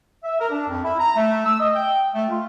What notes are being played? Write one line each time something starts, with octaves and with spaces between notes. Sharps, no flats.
E5
A#4
D4
F2
E4
A#5
A3
E6
D#5
G5
A3
F4